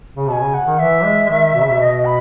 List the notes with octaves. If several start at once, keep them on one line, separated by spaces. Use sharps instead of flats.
C#3
B2 G#5 A5
C#3
F#5
D#3
E3 E5
G#3
D#3
B2
C#3
B2
D#5
B5